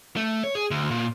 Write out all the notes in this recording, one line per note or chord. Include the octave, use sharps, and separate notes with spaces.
A3
C#5
G#4
D2
A#2